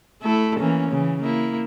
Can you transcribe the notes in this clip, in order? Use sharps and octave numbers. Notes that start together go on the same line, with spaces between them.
A3 E4 A4
E3 A#3 C#4
C#3 E3
A#3 E4